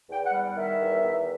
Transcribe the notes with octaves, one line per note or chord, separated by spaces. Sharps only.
E2 G5
F#5
G3
D#3 E5
E2
E2